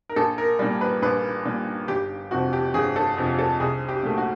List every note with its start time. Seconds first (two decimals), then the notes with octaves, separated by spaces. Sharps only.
0.09 A#4
0.16 A#1 A4
0.38 A#4
0.59 A#2 G3
0.81 B4
1.02 A#1 B4
1.45 A#2 G3
1.88 G1 G4
2.31 F2 C3 F3 F#4
2.53 G4
2.74 G1 G#4
2.96 A4
3.17 F2 C3 F3
3.39 A4
3.60 C2 G#4
3.89 G4
4.03 A#2 F#3 A3
4.17 F#4